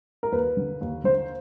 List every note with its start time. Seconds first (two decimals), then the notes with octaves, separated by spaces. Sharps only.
0.23 A#4
0.32 D#2 B4
0.57 D3
0.81 D#2
1.04 D3 C5